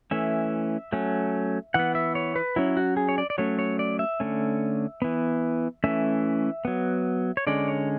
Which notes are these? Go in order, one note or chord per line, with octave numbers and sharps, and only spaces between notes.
E3 A3 C#4 E5
F#3 A3 C#4
E3 B3 F#5
E5
C#5
B4
F#3 C#4 E4
F#4
G#4
C#5
D5
D5
F#3 A3 C#4 C#5
C#5
D5
E5
D3 A3 C#4
E3 B3
E3 A3 C#4 E5
F#3 B3
C#5
D3 G#3 C#4 D5
C#5